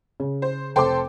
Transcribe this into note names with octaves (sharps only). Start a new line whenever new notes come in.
C#3
C5
F1 A4 C5 G5 C6 D6